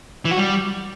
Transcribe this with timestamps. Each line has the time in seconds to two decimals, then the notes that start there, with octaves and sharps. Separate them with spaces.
0.25 E3
0.31 F#4
0.38 G3